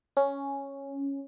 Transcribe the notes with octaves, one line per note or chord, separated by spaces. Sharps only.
C#4